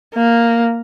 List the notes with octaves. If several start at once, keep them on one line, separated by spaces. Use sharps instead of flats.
A#3